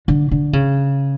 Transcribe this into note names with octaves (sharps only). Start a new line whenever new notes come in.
D3
D3
C#3